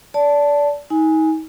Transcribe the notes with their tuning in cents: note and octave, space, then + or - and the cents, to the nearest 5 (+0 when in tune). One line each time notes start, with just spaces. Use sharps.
D5 -25 A5 +0
D#4 +35 G#5 +0